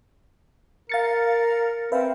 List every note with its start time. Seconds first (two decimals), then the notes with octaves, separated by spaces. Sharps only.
0.89 A#4 F5 A6 C#7
1.92 C4 B4 E5 F5